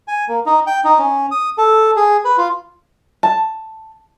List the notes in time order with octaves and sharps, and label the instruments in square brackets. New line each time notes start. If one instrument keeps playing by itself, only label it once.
[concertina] G#5
A#3
D#4
G5
D#4
C#4
D#6
A4
G#4
B4
F4
[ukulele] A5